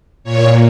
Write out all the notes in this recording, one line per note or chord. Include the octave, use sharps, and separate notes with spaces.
A#2 C#5